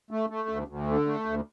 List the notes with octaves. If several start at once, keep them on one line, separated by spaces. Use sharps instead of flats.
A3
A3
D2
D2
D3
A3
D2